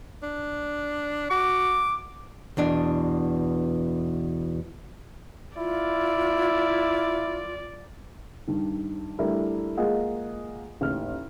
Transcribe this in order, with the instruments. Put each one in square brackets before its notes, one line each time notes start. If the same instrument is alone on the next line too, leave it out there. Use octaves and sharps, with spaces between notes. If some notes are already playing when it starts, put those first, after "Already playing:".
[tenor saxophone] D4
[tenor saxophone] F#4 [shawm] D6
[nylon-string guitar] E2 B2 D4
[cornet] E4 [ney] F4 [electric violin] D5
[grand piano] G2 D#3
G3 A3 D4 E4 A#4
G#3 A#3 F4 G#4 D#5 F#5
A1 D#2 F6